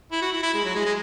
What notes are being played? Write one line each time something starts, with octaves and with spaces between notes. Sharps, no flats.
E4
F#4
E4
E4
G#3
F#3
G#3
G#3